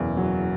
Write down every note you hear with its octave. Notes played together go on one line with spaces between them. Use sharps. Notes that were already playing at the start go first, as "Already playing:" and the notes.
Already playing: F#1 E2 B2
F#3